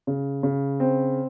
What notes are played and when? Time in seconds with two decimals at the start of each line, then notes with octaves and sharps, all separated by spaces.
0.07 C#3
0.43 C#3
0.80 C4